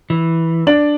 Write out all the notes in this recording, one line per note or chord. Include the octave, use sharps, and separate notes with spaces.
E3
D4 D5 F#7